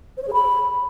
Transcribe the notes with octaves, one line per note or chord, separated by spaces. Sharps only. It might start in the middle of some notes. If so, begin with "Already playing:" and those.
C5
C#5
G#4
B5